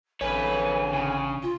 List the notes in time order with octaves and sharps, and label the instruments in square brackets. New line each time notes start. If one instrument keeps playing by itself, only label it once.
[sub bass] A1 [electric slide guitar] D3 A4 C#5 [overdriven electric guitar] B4 [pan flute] G#5
[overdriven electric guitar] C#3
[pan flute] F4